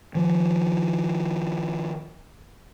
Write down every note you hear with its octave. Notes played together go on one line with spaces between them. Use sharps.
D#3 F3